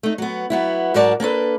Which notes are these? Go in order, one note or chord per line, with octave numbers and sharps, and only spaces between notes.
A3 D#4
F#3 B3
F#3 B3 E4
G#2 F#3 F#4 A#4 D5 A5
A#3 D4 A4 B4